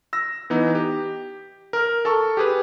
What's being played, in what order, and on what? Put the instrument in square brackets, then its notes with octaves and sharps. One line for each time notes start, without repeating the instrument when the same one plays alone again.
[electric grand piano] E6 A#6
E3 B3 D#4
G4
A#4 F6
A4 A5 C#6
G4 G#4 B4